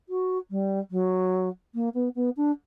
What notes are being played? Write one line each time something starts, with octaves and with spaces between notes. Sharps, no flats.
F#4
G3
F#3
A#3
B3
B3
D4